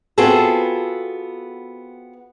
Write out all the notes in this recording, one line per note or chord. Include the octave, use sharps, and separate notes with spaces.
B3 C4 F4 F#4 G#4 A4